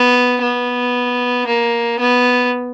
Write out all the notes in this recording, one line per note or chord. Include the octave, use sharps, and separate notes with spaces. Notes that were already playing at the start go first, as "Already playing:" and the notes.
Already playing: B3
B3
A#3
B3